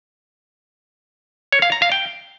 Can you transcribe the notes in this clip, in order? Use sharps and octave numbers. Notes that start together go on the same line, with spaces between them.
C#5
F5
A#5
F5
G5